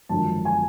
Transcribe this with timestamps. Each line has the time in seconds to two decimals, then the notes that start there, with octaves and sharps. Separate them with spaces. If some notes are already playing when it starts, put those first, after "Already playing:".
0.09 G#1 F#2 D3 F3 A5
0.45 G#5